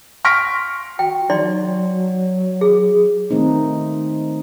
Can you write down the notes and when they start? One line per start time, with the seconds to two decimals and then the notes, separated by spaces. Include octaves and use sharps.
0.25 C6 C#6 F6 A#6 B6 D7
0.99 F#4 G5
1.30 F#3 D#4 D5 C6
2.61 G#4
3.31 D#3 A3 C4 D#4